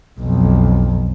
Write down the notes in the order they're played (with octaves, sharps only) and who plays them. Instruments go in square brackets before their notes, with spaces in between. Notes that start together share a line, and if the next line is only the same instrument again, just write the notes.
[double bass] B1 F2